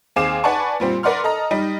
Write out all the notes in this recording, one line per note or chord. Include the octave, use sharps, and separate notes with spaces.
D#2 C4 G#4 F5 D6 E7
B4 D5 F#5 G#5 A5 C#6
A#2 G3 C4
A#4 B4 D5 F#5 C6 F6
A4 D#5 A#5
G3 D#4